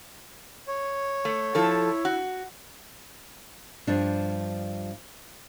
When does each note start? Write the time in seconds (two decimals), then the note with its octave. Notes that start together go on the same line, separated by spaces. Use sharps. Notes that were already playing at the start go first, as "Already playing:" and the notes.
0.67 C#5
1.25 A3
1.55 F3 E4 A4
2.05 F#4
3.87 G2 F3 D4